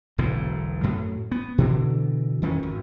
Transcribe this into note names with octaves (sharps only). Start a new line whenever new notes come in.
E1 B1 G#2 D3
F#2 A2
B3
B2 D3 E3
F2 D#3 C#4
G#1